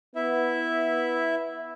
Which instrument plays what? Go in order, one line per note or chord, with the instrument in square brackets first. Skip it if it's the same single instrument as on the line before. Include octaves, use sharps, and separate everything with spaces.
[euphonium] B3 [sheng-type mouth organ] E4 E5